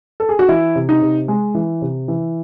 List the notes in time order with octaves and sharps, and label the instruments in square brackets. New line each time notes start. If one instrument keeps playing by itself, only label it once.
[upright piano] A4
G#4
F#4
E3 E4
C3
D#4
C3
G#3
E3
C3
E3